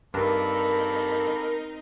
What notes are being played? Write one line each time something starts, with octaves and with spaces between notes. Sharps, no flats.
G2 A#3 C4 D4 D#4 A4 A#4 B5